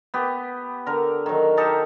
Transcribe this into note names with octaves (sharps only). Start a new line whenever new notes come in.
B3 G4
D3 A#4
D#3 F#3
D#4 G4 A4 A#4